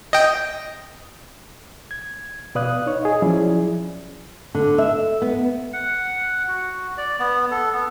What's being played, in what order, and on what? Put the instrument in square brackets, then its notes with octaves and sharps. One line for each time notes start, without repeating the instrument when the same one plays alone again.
[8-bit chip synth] D#5 G5
[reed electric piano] G#6
B2 B4 D5 F5 D#6 F#6
D#4 C#5
G#4 D#5
F3 F#3 C#4 E4 G#4 D5
[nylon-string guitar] D3
E5
B3
[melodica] F#5
F#4
D5
B3
A4
B3